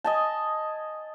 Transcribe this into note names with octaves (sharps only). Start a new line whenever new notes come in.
D#5 G#5 A5